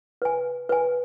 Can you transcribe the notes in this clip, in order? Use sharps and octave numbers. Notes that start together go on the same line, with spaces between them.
B4 G#5
B4 G#5